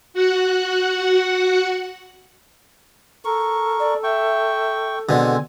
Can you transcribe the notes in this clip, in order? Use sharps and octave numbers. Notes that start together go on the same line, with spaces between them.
F#4 F#5
A4 A#4 C#6
D5
E5 G5 C#6
B2 D3 G#3 C4 G#5